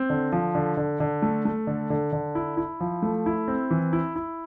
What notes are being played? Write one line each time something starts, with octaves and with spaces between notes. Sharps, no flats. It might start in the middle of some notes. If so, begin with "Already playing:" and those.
Already playing: C4
D3
F3
D3
D3
D3
A3
A3
D3
D3
D3
E4
E4
F3
A3
E4
C4
E3
E4
E4